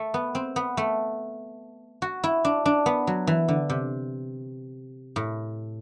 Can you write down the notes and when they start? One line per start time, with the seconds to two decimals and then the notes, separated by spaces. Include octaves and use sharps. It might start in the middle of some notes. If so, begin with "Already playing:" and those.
Already playing: A3
0.14 B3
0.35 C4
0.56 B3
0.77 A3
2.02 F#4
2.24 E4
2.45 D4
2.66 D4
2.86 B3
3.07 F#3
3.27 E3
3.48 D3
3.70 C3
5.16 A2